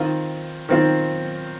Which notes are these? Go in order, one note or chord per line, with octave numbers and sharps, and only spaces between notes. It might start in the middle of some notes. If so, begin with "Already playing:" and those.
Already playing: D#3 C4 F4
D#3 C4 F4